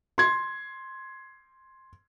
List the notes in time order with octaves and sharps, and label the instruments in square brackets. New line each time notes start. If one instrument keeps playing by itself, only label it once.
[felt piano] C6 G#6